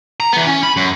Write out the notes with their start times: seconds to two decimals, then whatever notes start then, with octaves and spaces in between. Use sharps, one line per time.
0.20 A#5
0.33 E3 B3
0.47 C#4
0.63 B5
0.77 F#2